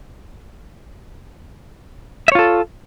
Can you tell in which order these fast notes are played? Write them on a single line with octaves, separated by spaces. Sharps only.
E5 C#5 F4 A4